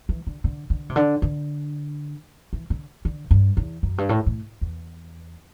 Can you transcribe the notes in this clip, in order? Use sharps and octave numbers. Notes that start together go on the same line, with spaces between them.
E3
D3
D3
D3
C3
D3
D3
E3
D3
D3
G2
E2
F#2
G2
A2
A2
E2